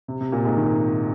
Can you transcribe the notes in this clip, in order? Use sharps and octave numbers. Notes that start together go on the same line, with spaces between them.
C3
C3
A#2
G#2
D#3